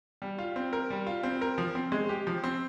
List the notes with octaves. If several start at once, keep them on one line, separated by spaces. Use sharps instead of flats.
G3
F4
C4
A#4
G3
F4
C4
A#4
F3
C4
G#3
G4
F3
C4